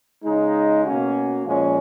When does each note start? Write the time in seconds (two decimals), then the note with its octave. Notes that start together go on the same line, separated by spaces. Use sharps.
0.24 C#3 G#3 D#4
0.85 B2 A#3 C#4 F#4
1.45 A#2 F3 G#3 C#4